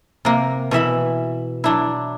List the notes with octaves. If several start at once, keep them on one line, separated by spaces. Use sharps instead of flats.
C3 A#3
B2 E3 E5 B5
F#3 D4 E4